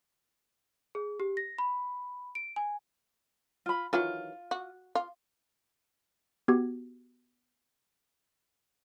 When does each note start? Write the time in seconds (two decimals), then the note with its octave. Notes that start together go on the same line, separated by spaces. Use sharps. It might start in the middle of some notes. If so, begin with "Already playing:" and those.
0.95 G#4
1.20 G4
1.37 A#6
1.58 B5
2.35 D7
2.56 G#5
3.66 F4 B5
3.93 D#3 E3 F#3 F4
4.51 F#4
4.95 F4
6.48 B3 F#4 G4 G#6